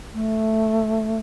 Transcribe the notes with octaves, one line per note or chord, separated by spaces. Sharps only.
A3